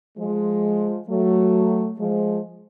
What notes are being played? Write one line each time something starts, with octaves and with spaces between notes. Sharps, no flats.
F3 G#3
F#3 A3
F3 G#3